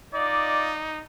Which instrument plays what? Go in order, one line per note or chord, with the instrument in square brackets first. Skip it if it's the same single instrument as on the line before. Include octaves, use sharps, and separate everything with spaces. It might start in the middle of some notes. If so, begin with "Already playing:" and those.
[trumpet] D#4 [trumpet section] F4 D#5 D6 [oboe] D5